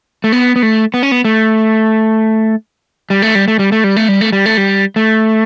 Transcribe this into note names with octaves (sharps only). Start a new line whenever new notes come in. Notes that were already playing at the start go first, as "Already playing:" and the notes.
A3
B3
B3
A3
B3
C#4
B3
A3
G3
A3
G3
A3
G3
A3
G3
A3
G3
A3
G3
A3
G3
A3